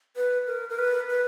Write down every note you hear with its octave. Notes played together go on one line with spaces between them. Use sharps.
B4
A#4
A#4
B4
B4